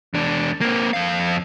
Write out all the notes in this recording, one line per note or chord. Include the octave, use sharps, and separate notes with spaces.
E2 D4
A#3 C4
F2 F5